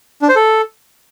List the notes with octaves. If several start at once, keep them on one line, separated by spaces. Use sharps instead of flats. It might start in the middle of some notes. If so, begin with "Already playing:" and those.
D4
C5
A4